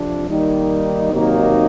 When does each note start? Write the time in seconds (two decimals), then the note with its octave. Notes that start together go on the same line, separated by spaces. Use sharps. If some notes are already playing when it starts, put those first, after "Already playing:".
Already playing: F2 C3 F3 D4
0.26 D#3 G3 A#3 D#4
1.11 C3 D#3 F#3 A#3 D#4